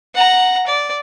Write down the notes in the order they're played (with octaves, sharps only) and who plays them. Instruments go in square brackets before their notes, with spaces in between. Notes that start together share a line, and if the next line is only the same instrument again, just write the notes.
[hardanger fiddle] F#5 A#5
D5